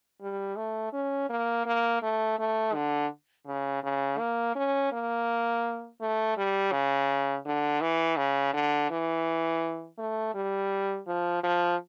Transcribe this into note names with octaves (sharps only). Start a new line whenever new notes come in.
G3
A3
C#4
A#3
A#3
A3
A3
D3
C#3
C#3
A#3
C#4
A#3
A3
G3
C#3
D3
E3
C#3
D3
E3
A3
G3
F3
F3